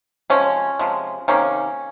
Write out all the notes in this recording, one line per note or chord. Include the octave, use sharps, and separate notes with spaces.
C3 F3 G#3 C#4
C3 F3 G#3
C3 D#3 A#3 C#4